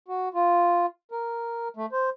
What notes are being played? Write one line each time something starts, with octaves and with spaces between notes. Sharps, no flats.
F#4
F4
A#4
A3
C5